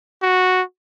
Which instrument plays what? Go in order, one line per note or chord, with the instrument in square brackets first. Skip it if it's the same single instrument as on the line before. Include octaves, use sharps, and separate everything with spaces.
[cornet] F#4